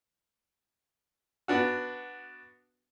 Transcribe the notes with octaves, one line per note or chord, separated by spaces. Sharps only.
B3 D4 F#4